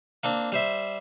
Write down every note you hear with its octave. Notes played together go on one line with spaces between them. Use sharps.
A#3 C4 D4
G3 C5 E5